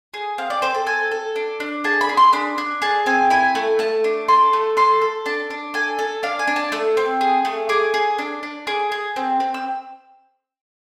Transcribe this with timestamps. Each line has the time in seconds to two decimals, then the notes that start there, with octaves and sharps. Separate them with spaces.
0.14 G#4
0.38 C4 F5
0.50 D5
0.62 C4 C5
0.74 A4
0.86 A4 G#5
1.11 A4
1.36 D4
1.60 D4
1.84 G#4 A5
2.01 B5
2.09 G#4
2.17 C6
2.33 D4 B5
2.58 D4
2.82 G#4 A5
3.06 C4 G#5
3.30 E4 G#5
3.55 A3
3.79 A3 A5
4.04 D4
4.28 A4 C6
4.53 A3
4.77 A4 C6
5.02 A4
5.26 D4 A5
5.50 D4
5.74 A4 G#5
5.99 A4
6.23 D4 F5
6.39 G#5
6.47 D4
6.56 A5
6.72 A3 E6
6.97 C4
7.21 G#4
7.45 A3
7.69 G#4 D6
7.94 G#4
8.19 D4
8.43 D4
8.67 G#4 D6
8.92 G#4
9.16 C4
9.40 C4
9.54 E6